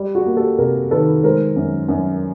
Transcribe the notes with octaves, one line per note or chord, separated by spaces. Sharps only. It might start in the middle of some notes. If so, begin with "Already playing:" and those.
Already playing: G3
F#4 G#4
A#3
G4 A4
C3 G#4 A#4
D#3 A4 B4
G#3 A#4 C5
F#2
F#2